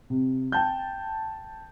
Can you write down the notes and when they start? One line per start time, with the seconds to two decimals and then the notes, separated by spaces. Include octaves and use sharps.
0.10 C3
0.52 G5 A5 G6